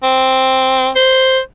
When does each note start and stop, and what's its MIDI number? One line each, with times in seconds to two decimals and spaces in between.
0.03 0.89 60
0.96 1.39 72